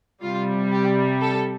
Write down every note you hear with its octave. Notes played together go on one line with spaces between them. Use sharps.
C3 G3 F4
G4
A4